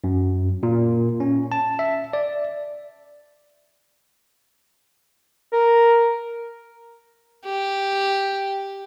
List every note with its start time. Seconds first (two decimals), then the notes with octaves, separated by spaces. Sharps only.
0.04 F#2
0.63 A#2
1.20 C#4
1.52 A5
1.79 E5
2.13 D5
5.54 A#4
7.45 G4